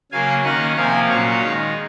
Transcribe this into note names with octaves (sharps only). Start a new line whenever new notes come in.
C#3 F#3 A#3 F5 G#5
D#3 A#3 C#4 D#5 F#5
C3 F3 A#3 F5 G#5
A#2 F#3 C#4 C#5 F5
D#3 G#3 D#4